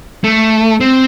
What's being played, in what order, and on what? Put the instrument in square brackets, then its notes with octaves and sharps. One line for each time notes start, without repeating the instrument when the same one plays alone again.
[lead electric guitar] A3
C4